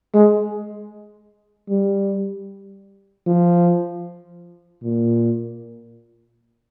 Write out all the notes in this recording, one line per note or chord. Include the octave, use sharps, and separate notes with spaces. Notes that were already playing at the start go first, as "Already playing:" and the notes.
G#3
G3
F3
A#2